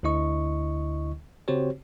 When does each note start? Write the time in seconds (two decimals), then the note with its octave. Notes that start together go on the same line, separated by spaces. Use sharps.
0.03 D2 D3 E4 D#5 C#6
1.48 C#3 C4 F#4 G4 C5 C#5